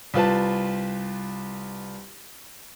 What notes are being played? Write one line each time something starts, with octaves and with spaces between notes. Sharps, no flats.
C2 F4 B4 A5